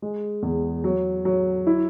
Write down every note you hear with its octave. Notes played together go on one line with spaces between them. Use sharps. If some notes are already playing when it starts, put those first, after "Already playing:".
G#3
E2
F#3
F#3
E4